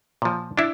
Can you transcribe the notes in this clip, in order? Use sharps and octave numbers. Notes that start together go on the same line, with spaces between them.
A#2 F3
D4 E4